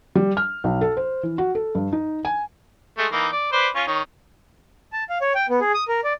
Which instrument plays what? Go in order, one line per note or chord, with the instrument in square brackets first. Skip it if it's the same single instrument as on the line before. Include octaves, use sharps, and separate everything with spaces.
[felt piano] G3
F6
B1
A4
C5
E3
F#4
A4
G2
D#4
G#5
[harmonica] G#3 A3
E3 A#3 D#4
D5
B4 C5 D5
C#4 F4 C#6
D#3 C#5
[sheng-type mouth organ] A5
F5
C#5
G5
B3
G#4
D#6
A#4
D5